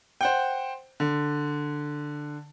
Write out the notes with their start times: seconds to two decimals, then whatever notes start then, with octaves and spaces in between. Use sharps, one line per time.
0.21 C5 F#5 G5
1.00 D3